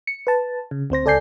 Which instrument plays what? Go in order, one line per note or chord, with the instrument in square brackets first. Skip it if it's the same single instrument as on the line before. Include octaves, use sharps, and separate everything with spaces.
[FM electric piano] C#7
B4 A5
C#3
D2 C4 C5 A#6
C#2 A4 D5 G#5 G6 C7